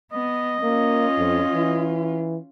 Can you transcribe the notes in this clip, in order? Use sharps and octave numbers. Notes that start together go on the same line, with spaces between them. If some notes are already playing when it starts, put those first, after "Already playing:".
B3 D#5
A#3 C#4 F4
F2
E3